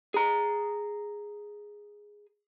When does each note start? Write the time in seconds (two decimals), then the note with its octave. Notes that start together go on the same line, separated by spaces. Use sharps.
0.14 G#4 A#5